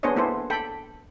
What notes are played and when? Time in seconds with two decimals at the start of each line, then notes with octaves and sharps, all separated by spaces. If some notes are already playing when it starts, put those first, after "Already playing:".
0.03 B3 D4 G#4 C5 C#5 D#5
0.16 A#3 B3 E4 A4 C5
0.50 A4 G5 B5